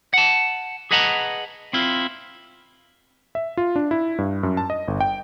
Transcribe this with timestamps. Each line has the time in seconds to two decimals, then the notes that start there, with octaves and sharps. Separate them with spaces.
0.14 F#5 A5
0.91 G#4 B4 D#5 F#5 A5 A#5
1.73 C4 E4 F4
3.35 E5
3.57 F4
3.76 D4
3.91 E4
4.18 G2
4.43 F#2
4.57 A5
4.70 D#5
4.88 G1
5.00 G5